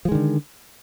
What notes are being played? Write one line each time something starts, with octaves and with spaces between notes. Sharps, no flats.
D3 D#3 F3 G#3